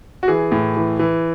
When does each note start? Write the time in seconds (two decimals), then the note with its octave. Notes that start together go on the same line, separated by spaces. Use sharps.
0.23 F#4
0.28 E3 G#4
0.52 A2
0.77 E3
0.99 E3